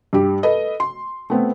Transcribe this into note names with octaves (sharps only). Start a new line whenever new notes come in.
G2 G4
A4 B4 D#5
C6
A3 B3 C4